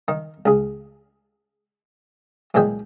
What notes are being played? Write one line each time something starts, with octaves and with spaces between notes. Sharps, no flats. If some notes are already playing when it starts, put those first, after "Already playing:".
D#3 D#4
C#2 G#4
B1 A#2 E3 G#3 G5 D#6